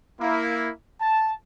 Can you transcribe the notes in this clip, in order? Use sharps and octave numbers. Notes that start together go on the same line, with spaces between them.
A#3 E4
A5